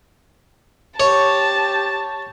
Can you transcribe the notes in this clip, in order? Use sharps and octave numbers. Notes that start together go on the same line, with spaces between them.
G4 C#5 A5